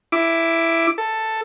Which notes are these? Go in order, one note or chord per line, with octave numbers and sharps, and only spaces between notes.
E4 D6
A4